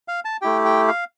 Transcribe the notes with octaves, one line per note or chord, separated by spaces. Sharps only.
F5
A5
A3 E4 G4 G5
G5
F5